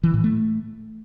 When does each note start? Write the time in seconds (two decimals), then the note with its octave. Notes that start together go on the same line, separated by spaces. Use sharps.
0.03 E3
0.14 A2
0.24 A3